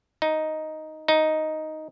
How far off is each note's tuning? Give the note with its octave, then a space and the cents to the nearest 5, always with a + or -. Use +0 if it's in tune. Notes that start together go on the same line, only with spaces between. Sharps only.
D#4 +5
D#4 +5